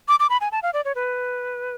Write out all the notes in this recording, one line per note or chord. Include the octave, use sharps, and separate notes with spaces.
D6
D6
B5
G#5
A5
F5
D5
C#5
B4